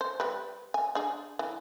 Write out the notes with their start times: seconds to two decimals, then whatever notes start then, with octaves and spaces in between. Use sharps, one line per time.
0.01 C5
0.20 G3 B4
0.74 G#5
0.95 D4 G#4
1.39 E3